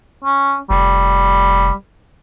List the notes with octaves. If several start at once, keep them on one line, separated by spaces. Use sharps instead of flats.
C#4
F1 G3